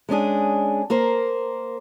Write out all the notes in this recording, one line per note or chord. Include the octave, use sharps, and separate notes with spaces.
G#3 C#4 D4 G#4
A#3 A#4 C5